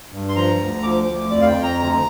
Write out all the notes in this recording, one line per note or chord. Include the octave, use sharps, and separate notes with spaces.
G2
C6
F3 A#5
D2
F3 D6
D2
F2 D5
F5
G5
F2
A#5
D2 A#5